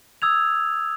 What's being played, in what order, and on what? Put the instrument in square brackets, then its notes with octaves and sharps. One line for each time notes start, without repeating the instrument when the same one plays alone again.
[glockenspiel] D#6 E6 G#6 F7